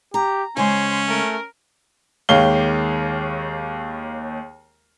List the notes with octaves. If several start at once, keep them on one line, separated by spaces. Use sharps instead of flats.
G4 A#5
C#3 G#3 C#4 C5 G#5
A3 A#4
D#2 D#3 G#3 C#5 F5 G7